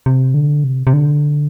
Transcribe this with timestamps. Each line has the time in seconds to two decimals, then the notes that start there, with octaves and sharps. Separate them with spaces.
0.06 C3
0.34 D3
0.64 C3
0.87 C3
0.93 D3